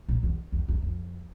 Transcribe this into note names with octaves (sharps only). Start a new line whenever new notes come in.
A#2
E2
E2
E2
F2